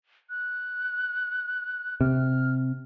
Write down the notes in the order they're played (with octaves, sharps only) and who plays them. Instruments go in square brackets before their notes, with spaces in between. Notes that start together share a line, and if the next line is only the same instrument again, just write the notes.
[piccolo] F#6
[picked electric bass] C3 [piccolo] F6